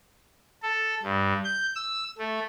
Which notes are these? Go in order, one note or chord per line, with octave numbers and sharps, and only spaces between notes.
A4
G2
G6
E6
A3